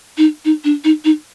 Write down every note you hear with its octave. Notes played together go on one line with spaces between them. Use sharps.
D#4
D#4
D4
D#4
D#4